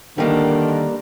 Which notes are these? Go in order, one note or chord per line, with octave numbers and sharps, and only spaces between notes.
D3 D#3 G3 A#3 D4